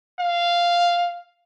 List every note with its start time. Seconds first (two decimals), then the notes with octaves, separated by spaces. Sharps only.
0.20 F5